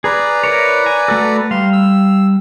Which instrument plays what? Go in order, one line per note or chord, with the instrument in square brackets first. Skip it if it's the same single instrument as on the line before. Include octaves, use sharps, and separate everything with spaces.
[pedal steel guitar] G#4 [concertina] B4 D5 A#5
[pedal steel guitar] E4 A#4 C#5
G#5
A3 F#4 A4
[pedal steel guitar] G3 F5 [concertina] C6
[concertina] E6